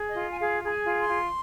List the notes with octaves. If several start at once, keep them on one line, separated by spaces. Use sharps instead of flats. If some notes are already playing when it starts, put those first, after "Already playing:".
Already playing: G#4
D#5
F4
G#5
G#4 F5
G#4 A#5
G#5
F4
C6
F4